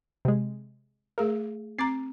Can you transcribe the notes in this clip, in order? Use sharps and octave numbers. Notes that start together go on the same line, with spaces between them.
C3 G#3
A3 G#4 A#4 F5
C4 A#5 D6 A6 C7